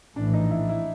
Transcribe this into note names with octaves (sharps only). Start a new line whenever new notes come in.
A#1 A2 E3 D4
D#4
E4
E4